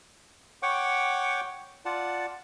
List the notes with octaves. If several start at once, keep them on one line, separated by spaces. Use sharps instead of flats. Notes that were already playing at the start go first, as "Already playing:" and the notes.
C#5 F#5 G5 C#6 D6
F4 D5 F#5 A5